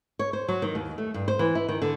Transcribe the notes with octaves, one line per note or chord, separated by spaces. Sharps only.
C#5
C5
F#3
D#3
D#2
A3
G2
C5
E3
E4
D#3
D3